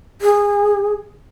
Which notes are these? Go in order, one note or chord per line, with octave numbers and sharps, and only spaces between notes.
G#4